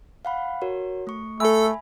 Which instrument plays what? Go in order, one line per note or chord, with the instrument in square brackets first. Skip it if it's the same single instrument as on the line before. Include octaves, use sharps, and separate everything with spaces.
[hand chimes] F5 F#5 B5
F#4 A#4 C#5
A3 C#6
[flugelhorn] A3 [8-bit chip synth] A4 E6 [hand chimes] E5 G#5 B5